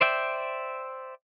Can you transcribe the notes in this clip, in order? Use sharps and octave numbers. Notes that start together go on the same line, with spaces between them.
C5 D5 E5 G5